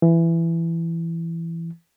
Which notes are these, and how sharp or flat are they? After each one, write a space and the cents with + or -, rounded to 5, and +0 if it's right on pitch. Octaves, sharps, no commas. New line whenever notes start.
E3 +15